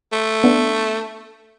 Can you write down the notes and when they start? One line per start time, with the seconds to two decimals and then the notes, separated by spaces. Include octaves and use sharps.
0.12 A3
0.44 B3 D4